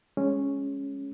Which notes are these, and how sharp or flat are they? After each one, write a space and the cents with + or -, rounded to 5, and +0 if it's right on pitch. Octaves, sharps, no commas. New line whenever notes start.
F3 +0 G#3 +0 C#4 +0